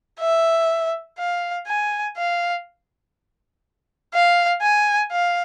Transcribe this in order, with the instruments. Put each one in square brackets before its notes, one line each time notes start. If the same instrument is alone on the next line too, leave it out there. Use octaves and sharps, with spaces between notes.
[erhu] E5
F5
G#5
F5
F5
G#5
F5